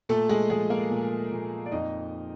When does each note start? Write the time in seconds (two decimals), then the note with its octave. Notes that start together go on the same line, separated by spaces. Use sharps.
0.09 A#2 A3 A4
0.29 G#3 G#4
0.50 F3 G#3 G#4
0.70 A#3 A#4
0.91 A#2
1.31 A#2
1.66 D5
1.72 F2 D#4 D#5